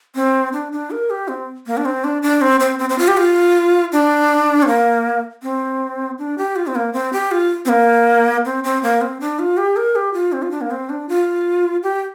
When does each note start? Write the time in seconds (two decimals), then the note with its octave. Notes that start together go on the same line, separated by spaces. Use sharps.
0.15 C4
0.53 D4
0.72 D4
0.91 A#4
1.10 G4
1.28 C4
1.66 A#3
1.77 D4
1.85 C4
2.04 D4
2.22 D4
2.41 C4
2.60 C4
2.79 C4
2.89 C4
2.98 F4
3.08 G4
3.17 F4
3.92 D4
4.63 C4
4.67 A#3
5.43 C4
6.18 D4
6.38 G4
6.56 F4
6.67 C4
6.75 A#3
6.93 C4
7.13 G4
7.31 F4
7.65 C4
7.69 A#3
8.45 C4
8.64 C4
8.83 A#3
9.01 C4
9.20 D4
9.39 F4
9.57 G4
9.76 A#4
9.95 G4
10.13 F4
10.32 C4
10.42 F4
10.51 D4
10.61 A#3
10.71 C4
10.89 D4
11.09 F4
11.83 G4